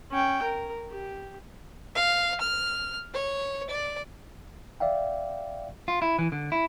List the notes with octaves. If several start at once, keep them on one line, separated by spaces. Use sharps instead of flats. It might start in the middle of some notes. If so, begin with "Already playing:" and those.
C#4 G5
A#4
G4
F5
F6
C#5
D5
D5 E5 F5 G5
F4
E4
E3
D3
E4